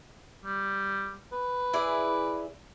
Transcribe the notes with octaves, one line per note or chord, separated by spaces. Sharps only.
G3
B4
E4 G#4 D5